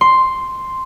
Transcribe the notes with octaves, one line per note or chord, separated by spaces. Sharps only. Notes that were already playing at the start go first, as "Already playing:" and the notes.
C6